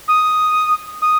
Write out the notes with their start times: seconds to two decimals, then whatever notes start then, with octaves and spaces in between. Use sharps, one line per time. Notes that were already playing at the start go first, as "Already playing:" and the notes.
0.08 D#6
1.02 D#6